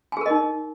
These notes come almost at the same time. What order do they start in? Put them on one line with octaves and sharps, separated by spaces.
G#5 G#4 A#4 D#5 D#4